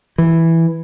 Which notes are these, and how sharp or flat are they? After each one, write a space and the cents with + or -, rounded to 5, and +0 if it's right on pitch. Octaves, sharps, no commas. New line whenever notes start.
E3 +0